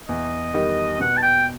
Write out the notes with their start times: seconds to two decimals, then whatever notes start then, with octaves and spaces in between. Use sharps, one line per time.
0.08 E2 D#5
0.54 D#3 G3 D#4
1.00 B2 F#5
1.18 A5
1.22 G5